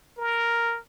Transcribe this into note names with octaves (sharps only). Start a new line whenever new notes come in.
A#4